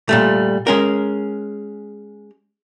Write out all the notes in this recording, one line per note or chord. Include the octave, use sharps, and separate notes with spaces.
A#2 G3 A3
G#3 C#4 A#4